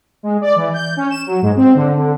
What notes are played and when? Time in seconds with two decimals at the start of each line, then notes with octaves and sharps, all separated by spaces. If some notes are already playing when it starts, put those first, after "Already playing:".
0.23 G#3
0.41 D5
0.56 E3
0.73 G6
0.97 C#4
1.10 E7
1.26 F#3
1.42 G#2
1.56 C4
1.75 D3
1.97 D3